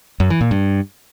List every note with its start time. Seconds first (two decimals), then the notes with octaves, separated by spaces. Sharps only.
0.20 F#2
0.30 E3
0.41 A#2
0.51 G2